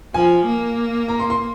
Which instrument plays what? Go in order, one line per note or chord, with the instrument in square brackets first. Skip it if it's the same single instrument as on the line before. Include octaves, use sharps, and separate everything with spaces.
[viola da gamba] F3 [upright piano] G#5
[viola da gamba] A#3
[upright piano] A#5
C6
C6